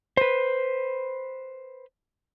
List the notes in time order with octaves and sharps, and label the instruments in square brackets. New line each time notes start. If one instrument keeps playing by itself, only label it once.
[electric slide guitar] B4 C5